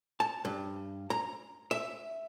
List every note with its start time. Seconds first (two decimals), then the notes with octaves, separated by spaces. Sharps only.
0.20 A5
0.45 G2
1.10 A#5
1.71 E5